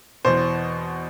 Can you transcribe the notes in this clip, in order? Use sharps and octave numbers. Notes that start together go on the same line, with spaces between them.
E2 B2 C5